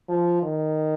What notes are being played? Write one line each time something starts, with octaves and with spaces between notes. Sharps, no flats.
F3
D#3